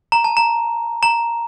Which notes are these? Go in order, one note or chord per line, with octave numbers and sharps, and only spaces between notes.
A#5
A5
A#5
A#5